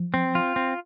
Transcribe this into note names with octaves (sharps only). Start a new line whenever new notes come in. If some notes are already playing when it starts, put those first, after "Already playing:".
Already playing: F3
C4
F4
C4